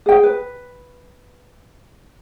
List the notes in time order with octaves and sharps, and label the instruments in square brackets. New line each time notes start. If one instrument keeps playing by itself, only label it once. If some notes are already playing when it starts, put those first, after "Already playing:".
[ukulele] G#4 G5
B4